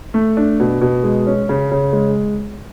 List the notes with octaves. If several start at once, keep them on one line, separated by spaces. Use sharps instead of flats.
A3
D4
B2
B2
G#3
C#4
C#3
C#3
G#3